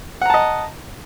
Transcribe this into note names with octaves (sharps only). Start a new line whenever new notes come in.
D#5 F#5 A5 A#5